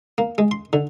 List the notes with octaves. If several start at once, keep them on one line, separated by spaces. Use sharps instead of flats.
A#3
G#3
C6
D3